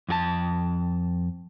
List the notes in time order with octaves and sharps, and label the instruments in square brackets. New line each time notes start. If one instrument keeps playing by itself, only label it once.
[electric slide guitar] F2 F#4 A5